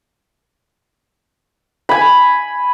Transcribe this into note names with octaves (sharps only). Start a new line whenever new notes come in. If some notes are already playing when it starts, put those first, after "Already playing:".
G#5 B5